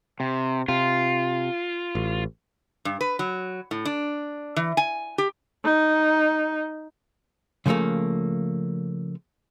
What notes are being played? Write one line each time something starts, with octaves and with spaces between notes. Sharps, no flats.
C3
C3 F4
A1
G2
B4
F#3
A2
D4
E3
G#5
G4
D#4
C#3 F3 G3 A3 A#3